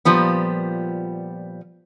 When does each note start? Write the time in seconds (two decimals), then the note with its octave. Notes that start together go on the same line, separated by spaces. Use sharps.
0.05 A#2 F3 G3 B3